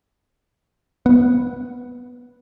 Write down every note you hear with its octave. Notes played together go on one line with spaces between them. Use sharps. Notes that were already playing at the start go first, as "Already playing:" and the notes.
B3